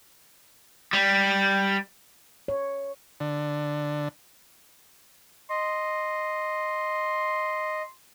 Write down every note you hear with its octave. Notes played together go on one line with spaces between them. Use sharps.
G3
C#5
D3
D#5 C6